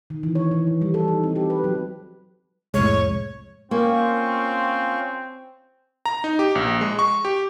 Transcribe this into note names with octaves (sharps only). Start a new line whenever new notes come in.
D#3
E3
C#5
E3
F3
G3
A4
D#4
C4
G4
B4
F#3
C2 F2 A2 G#3 C#5
A#3 C4 C#4 F4 C#6
A#5
D#4
G4
A#1
G#3
C#6
G4